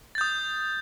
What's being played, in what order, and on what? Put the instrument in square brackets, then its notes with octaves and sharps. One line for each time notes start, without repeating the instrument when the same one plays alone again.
[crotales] A6
G6
D#6